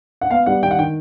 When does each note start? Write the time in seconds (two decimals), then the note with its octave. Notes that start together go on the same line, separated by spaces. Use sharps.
0.21 F#5
0.31 B3 F5
0.46 G3 F#5
0.63 D#3 G5
0.71 F#5
0.79 D#3 G5